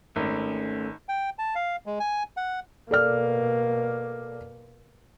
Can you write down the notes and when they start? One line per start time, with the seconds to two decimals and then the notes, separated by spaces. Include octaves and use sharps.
0.16 G#1 A3 C#4
1.09 G5
1.39 A5
1.55 F5
1.86 G#3
2.00 G#5
2.37 F#5
2.91 B2 A#3 A4 D5 F6